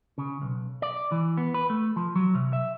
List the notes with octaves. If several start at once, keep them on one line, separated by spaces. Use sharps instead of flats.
C#3
B1
D5
E3
B3
B4
A3
F3
F#3
C3
E5